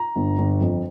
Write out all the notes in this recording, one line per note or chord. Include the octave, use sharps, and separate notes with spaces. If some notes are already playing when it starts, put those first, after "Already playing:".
Already playing: A#5
G1
G1
F2